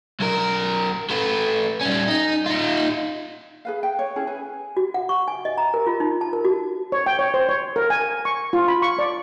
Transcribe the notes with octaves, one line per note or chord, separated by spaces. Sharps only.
B1 A#4
A3 B4
G3 C#4
D#4
D#4 F4
G#4 B4 F5
G5
C#5
C#4 E4 G#4
G#4 B4 G#5
F#4
F#5
C#6
G#5
D#5
A#5
A#4
F4
D#4
A5
A#4
F#4
C#5
G5
C#5
C5
C#5
A#4
G#5
C#6
F4
B5
C#6
D5